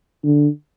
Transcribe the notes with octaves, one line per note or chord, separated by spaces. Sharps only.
D3